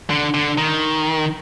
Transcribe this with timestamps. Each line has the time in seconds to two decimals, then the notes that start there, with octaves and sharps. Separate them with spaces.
0.10 D3
0.34 D3
0.58 D#3